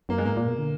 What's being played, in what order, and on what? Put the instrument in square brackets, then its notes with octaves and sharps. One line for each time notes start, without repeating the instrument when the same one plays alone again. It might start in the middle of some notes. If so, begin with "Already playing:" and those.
[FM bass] F#2 [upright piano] A#3
[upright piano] G#3
[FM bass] G#2 [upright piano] A#3
[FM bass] A#2
B2
D3